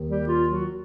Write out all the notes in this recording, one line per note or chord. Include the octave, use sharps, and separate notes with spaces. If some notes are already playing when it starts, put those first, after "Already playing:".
Already playing: D#2 D#3
G3 G4
F4
F#3 F#4